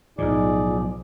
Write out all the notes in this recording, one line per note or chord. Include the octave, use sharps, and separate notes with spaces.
B1 A2 F3 D#4 G#4 D5